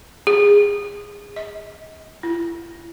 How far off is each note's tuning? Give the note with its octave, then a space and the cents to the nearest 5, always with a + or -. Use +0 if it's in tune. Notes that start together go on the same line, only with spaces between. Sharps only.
G#4 -20
D#5 +35
E4 +45